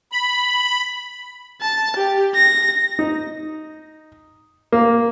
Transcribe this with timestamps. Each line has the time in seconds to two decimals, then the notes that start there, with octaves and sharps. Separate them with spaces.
0.12 B5
1.61 A5
1.96 G4
2.35 A#6
2.99 D#4
4.72 A#3